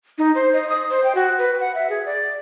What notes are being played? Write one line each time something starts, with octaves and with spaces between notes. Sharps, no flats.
D#4
C5
D#5
D#6
C5
G5
F#4
B4
F#5
E5
G#4
D5